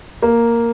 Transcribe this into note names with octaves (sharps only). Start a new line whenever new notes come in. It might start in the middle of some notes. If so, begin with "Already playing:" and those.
A#3